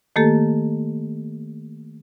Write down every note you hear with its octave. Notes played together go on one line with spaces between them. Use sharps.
D#3 A3 A#3 G4 A4